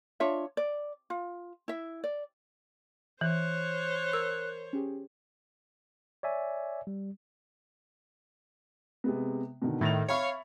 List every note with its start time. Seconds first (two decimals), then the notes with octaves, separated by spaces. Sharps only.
0.20 D4 F4 C#5 E5
0.57 D5
1.10 F4
1.68 E4 E5
2.04 D5
3.21 E3 C5 C#5 F#6
4.13 A#4 E6
4.73 C#4 G4 G#4
6.23 C#5 D5 E5 G#5
6.87 G3
9.04 C3 G#3 B3
9.62 B2 D3 D#3
9.81 A2 D#3 G#6 A6 F7
10.09 C#5 E5 F5 B5 C#6